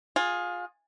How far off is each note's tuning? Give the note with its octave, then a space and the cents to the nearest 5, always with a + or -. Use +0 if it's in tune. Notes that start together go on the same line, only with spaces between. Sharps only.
F4 +20 G#4 +0